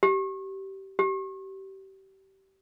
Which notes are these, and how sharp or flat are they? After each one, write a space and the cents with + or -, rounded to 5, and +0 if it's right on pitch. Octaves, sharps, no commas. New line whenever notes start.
G4 -25
G4 -30